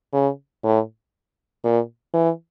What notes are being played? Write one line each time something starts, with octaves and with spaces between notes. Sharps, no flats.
C#3
A2
A#2
E3